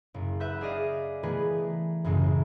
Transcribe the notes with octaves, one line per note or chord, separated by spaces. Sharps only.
F#1
B4 E5 F#5 B5 G6
G#4 D5 D#5 F5
E3 A3 B3 G#4 A#4 B4
F#2 A2 C#3 F#3 G#3 A3